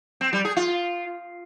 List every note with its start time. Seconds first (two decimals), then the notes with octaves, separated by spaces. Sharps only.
0.21 C4
0.33 G3
0.45 G#4
0.56 F4